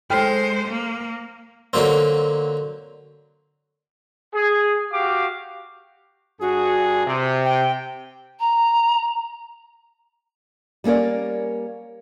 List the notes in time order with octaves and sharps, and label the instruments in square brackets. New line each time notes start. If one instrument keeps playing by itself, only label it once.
[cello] G#3 C5 [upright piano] A4 G5 F6
[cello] A#3
[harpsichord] D3 F#3 A#3 C4
[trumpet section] G#4
F#4 G4 F5 D6
[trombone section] G2 G#4 [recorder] F#4
[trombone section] C3
[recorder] G5
[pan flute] A#5
[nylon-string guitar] G3 A#3 C#4 A#4 D5